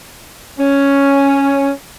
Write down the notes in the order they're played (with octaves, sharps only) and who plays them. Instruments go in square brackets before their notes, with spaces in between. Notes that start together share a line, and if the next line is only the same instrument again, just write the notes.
[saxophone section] C#4